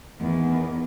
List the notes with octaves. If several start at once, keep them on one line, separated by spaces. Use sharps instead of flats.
E2 D#3